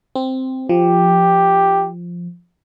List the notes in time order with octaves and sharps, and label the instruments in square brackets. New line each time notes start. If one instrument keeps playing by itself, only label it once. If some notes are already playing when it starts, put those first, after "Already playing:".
[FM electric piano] C4
[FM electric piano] F3 [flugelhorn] G4